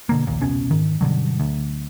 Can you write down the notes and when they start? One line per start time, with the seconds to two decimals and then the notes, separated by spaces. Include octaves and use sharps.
0.09 B2 D3 A#3
0.27 A#1 D#2 A#2
0.41 F1 C#2 B2 C#4
0.71 G#2 D#3
1.01 G2 B2 D3 F#3
1.40 D2